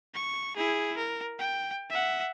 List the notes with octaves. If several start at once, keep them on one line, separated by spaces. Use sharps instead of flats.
C#6
E4 G#4
A#4
G5
E5 F#5